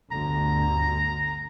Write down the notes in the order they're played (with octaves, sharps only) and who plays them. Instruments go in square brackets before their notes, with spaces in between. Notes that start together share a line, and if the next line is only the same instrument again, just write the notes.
[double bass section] G1 D2 D3 [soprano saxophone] A#5